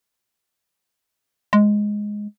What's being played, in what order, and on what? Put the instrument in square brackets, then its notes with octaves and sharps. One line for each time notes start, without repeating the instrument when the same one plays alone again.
[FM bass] G#3